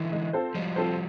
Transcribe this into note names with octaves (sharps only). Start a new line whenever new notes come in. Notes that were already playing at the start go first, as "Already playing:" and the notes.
Already playing: D3 E3
G#3
C4 F4 A4 C5
F3 G3 G#3
C4 F4 A4 C5